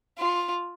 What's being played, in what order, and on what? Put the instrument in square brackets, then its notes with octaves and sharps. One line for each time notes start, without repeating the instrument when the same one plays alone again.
[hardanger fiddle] F4